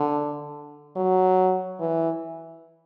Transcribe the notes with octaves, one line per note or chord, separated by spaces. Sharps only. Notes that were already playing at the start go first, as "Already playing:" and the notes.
Already playing: D3
F#3
E3